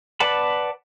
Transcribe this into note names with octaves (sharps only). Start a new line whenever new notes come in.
B4 D5 F#5 A5 B5